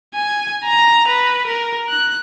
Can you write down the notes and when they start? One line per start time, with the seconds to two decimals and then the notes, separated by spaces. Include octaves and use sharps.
0.15 G#5
0.65 A#5
1.08 B4
1.47 A#4
1.89 F#6